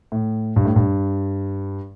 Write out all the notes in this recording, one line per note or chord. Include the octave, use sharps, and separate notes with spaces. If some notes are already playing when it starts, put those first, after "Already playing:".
A2
G2
A2
G2